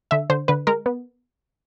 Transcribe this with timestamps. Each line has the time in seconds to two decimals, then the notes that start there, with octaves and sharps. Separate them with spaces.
0.11 D3 E5
0.30 D3 C5
0.48 D3 B4
0.67 G#3 A#4
0.86 B3